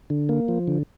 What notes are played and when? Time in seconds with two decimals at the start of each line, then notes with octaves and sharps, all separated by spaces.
0.10 D3
0.29 A#3
0.48 F3
0.68 D3